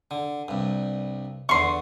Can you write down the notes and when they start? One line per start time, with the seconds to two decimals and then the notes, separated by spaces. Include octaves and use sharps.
0.11 D3
0.48 C2 G2
1.49 E2 D3 C6 C#6